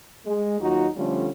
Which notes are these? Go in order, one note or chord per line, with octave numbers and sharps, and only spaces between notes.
G#3
D#2 F#3 D#4 F4 F#4
D3 F3 G3 A3 C#4 F4